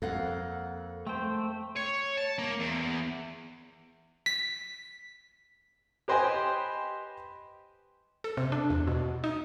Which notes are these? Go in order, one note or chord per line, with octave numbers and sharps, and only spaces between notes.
F2 A#3 A4 F5 F#5
A3 C5 G5
C#5
A5
A#3
E2
B6
G4 B4 C5 D#5 G5 G#5
A4
C3
D4
E2
B2
D#4